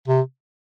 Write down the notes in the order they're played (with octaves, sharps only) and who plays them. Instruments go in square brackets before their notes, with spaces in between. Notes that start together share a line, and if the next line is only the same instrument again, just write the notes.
[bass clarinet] C3